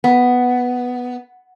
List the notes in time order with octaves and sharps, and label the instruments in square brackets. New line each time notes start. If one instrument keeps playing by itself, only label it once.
[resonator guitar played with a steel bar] B3